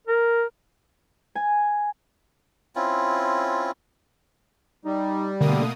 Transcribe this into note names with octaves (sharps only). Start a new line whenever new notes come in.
A#4
G#5
C4 C#4 E4 F4
G3 D#4
B2 D3 A3 A#3 D#6